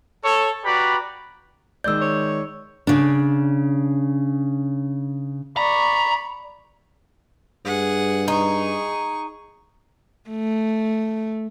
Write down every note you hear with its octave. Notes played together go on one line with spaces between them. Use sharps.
A4 C#5
F#4 G4 B4 D5 A#5 B5
D#3 G#3 D5 E6 G6
C#5
C#3 D4
D5 A#5 B5 C#6
G2 G#4 F#5
D#4 G#4 C#6
A3